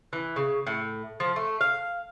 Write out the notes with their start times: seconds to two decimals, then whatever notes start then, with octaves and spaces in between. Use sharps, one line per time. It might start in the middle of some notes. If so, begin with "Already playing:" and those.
0.13 E3
0.36 C#3
0.67 A2
1.20 F3
1.36 A3
1.61 F5